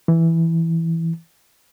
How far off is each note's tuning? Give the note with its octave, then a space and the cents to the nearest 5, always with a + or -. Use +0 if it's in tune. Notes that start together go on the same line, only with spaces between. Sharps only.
E3 +0